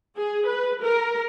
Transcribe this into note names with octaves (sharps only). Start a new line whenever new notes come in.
G#4
B4
A#4